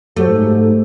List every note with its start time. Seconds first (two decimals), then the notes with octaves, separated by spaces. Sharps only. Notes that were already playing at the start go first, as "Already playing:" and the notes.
0.17 F#2 F#3 A3 F#4 G4 A4 C5
0.28 G#2